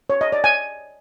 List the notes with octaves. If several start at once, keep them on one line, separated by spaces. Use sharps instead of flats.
C#5
D#5
D5
G#5